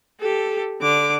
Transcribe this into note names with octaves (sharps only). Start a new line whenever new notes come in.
G4 A4
D3 D6